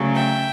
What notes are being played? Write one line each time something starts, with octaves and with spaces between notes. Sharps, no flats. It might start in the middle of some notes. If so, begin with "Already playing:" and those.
Already playing: D2 C#3 F#3
E5 G5